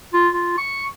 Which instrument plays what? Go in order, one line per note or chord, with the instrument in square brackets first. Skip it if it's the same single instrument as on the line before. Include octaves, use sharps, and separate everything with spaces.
[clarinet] F4
F4
C#6